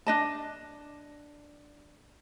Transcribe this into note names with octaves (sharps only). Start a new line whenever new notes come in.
D4 D#5 A5